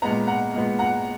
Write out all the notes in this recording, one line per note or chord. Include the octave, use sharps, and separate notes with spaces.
A#2 G#3 B3 F#5 A#5
F#5 A#5
A#2 G#3 B3
F#5 A#5